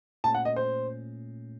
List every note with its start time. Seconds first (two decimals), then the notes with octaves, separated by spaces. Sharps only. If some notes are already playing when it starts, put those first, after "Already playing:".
0.24 A#2 A3 C#4 A5
0.34 F#5
0.45 D#5
0.56 C5